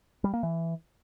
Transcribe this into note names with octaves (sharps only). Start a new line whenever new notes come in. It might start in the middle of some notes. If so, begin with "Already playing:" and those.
G3
A#3
E3